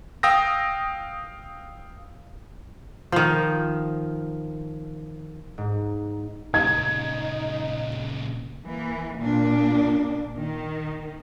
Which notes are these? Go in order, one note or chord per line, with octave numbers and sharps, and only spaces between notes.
F5 G5 D#6 E6 A#6
D#3 F3
G#2
A#2 C#3 D#4 G#6
E3 A#3
A#2 D4
D#3